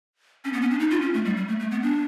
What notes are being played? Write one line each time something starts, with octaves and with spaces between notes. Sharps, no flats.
C#4
B3
C#4
D4
D#4
F4
C#4
A3
G3
G3
A3
A3
B3
D4